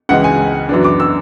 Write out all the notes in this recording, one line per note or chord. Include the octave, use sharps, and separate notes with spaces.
C#2 C#3 E3 G#3 F#5
G#5
F#2 E3 B3 D4
D6
E6